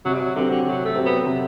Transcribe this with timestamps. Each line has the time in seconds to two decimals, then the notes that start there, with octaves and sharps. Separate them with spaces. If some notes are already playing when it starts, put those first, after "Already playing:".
0.05 C3 F#3
0.14 G3
0.20 F#3
0.36 D3 F#3 C4 G4 C5
0.50 D3
0.66 C3 F#3
0.85 A3
0.96 F#3 C4 G4 C5
1.06 B3
1.26 C3